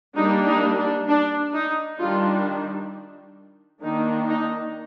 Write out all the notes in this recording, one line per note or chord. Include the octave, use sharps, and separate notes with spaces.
G3 A#3 D4 D#4
D#4
D4
D4
D#4
D#3 G3 D4 F4
D#3 A#3 D4 D#4
D#4